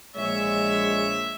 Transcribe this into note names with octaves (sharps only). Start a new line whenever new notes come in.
A#1 G#3 C#5 E5